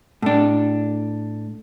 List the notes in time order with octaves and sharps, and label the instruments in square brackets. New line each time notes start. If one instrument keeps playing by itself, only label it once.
[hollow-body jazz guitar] A2 D4